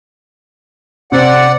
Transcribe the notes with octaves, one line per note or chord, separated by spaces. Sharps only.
C3 C4 D5 F#5